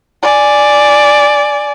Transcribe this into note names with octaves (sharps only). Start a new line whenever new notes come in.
D5 G#5